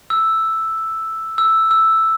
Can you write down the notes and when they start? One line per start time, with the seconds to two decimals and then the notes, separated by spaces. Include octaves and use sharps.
0.10 E6
1.38 E6
1.71 E6